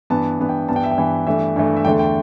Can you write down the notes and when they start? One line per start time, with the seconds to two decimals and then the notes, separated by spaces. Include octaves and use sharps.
0.10 G2 E3 B3 A5
0.39 G2 E3 B3
0.49 G5
0.68 G2 E3 B3 A5
0.76 G5
0.84 E5
0.91 G5
0.98 G2 E3 B3
1.27 G2 E3 A3 E5
1.56 G2 E3 A3
1.77 E5
1.85 E2 D3 A3 G5
1.99 G5